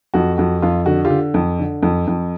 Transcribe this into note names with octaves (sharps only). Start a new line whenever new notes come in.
F2 F#4
F2 F#4
F2 F4
D3 F#4
F4 G4
D3
F2
D3
F2
F2